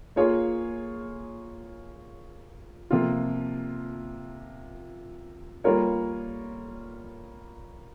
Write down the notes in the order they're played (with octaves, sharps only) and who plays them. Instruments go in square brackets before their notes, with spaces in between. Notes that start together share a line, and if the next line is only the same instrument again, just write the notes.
[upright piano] A#3 F4 G#4 C#5
C3 F3 A#3 F4
G3 A#3 F4 A#4 C#5